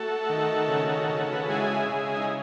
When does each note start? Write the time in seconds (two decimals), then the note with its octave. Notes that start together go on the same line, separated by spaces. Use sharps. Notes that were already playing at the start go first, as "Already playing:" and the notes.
Already playing: A3 F#4 A4
0.29 D#3
0.68 C#3
1.09 C#3
1.32 B4
1.41 A4
1.49 G#3 E4 G#4
1.89 C#3
2.16 D#4